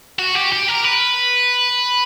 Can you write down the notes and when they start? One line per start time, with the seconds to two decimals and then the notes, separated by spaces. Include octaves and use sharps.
0.19 F#4
0.35 G4
0.53 G4
0.68 A#4
0.85 B4